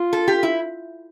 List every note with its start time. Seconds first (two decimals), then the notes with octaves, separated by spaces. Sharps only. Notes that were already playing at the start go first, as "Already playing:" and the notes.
Already playing: F4
0.13 A4
0.28 G4
0.43 E4